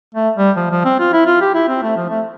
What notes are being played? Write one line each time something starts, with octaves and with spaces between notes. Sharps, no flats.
A3
G3
F3
F3
C4
F4
E4
F4
G4
E4
C4
A3
F3
A3